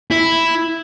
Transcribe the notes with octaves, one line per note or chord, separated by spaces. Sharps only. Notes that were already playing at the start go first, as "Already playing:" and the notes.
E4